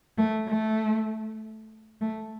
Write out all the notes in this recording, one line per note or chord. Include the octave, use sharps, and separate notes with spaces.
A3
A3
A3